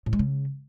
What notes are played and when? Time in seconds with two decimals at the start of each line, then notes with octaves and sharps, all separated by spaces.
0.06 A2
0.13 G#3
0.19 C#3